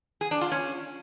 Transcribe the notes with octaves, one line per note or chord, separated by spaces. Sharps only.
G#4
D4
F4
C#4